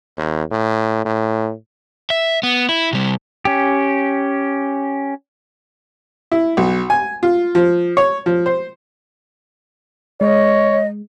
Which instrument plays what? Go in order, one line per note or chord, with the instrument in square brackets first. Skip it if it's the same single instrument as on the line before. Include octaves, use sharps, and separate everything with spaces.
[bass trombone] D#2
A2
A2
[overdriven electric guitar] E5
B3
E4
C3 G3
[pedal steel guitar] C#4 G4
[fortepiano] E4
B1
G#5
F4
F3
C#5
F3
C5
[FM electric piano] G#3 [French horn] C#5 [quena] D#5